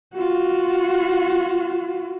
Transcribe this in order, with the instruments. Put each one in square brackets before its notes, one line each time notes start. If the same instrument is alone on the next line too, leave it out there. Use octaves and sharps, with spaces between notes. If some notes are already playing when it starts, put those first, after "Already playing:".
[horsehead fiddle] F4 F#4